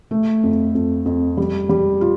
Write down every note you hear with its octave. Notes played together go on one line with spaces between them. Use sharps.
A3
F2
F2
F2
G3
G3
F4